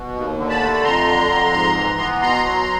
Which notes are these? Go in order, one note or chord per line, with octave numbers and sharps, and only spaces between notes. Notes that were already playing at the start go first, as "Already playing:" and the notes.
Already playing: B2
D#2
D3
A5 B5
A3
B5
F2 A#5 C6
D3
F2
G#2
E3
B3
B2 A#5 C6
F#3